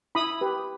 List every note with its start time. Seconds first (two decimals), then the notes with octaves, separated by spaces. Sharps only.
0.15 E4 B5 D#6
0.41 G4 B4